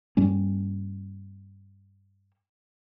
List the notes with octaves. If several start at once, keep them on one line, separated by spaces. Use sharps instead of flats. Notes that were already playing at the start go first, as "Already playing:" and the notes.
G2 G3 A#3 C#4